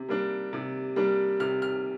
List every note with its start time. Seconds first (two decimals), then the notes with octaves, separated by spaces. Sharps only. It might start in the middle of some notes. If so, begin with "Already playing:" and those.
Already playing: C3
0.08 G3 A#3 D4
0.53 C3
0.96 G3 A#3 D4
1.40 C3 F6
1.62 F6